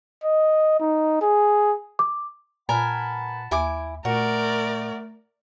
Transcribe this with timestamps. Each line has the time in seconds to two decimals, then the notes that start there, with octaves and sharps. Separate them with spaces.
0.24 D#5
0.80 D#4
1.22 G#4
1.99 D6
2.69 A#2 A#4 B4 F#5 G#5 A5 B5
3.51 D#2 E4 G#5 D6
4.05 A#2 A3 F#4 A#4 D5